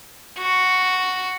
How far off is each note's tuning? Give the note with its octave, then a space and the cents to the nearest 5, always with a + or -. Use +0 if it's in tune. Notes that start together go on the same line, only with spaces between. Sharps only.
F#4 +0